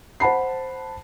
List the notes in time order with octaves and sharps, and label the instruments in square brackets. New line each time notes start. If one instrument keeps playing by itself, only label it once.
[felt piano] C5 F#5 A5 B5 C7